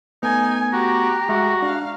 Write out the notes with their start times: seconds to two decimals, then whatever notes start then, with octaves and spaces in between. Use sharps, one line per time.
0.23 A3 B3 D#4 G#5
0.73 F#4 G4 A#5
1.29 G#3 F#4 E5
1.62 D4 F5